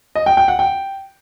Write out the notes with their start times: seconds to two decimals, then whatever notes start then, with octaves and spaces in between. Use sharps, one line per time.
0.15 D#5
0.26 G5
0.37 G5
0.48 F#5
0.59 G5